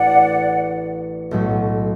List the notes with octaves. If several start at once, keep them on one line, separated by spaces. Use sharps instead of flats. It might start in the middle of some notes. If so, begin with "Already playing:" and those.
Already playing: A1 A2 E3 D4 D5 F#5
B1 A2 F#3 A3